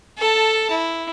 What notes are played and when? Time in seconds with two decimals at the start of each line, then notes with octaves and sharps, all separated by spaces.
0.18 A4 A5
0.70 E4